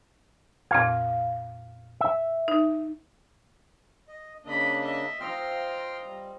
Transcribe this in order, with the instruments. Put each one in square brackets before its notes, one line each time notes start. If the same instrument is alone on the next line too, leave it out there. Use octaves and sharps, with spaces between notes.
[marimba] F2 A#2 C4 [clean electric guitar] F5
[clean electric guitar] E5
[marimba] D#4
[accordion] D#5
[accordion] C#3 A#3 D4 [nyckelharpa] D#5 B5
[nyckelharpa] D#5 E5
[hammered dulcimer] C4 D#5 F5 [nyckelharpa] F4 A#5 [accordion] G5 C6 F6
[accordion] G3